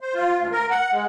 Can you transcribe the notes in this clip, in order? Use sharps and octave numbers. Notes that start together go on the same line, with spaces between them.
C5
F4
D2
A#4
F#5
G#3